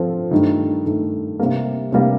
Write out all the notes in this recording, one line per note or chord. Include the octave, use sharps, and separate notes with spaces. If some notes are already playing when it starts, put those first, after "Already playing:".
Already playing: F3 C4 F4 A4
G2 D#3 A3 D#4
G2 D#3 A3 D#4
C3 G3 A#3
C3 G3 A#3